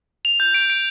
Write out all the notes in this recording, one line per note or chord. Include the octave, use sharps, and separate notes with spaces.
F7
G6
D7
D7